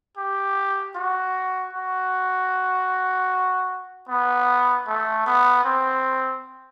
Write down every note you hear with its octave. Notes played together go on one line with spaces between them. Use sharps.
G4
F#4
F#4
B3
A3
B3
C4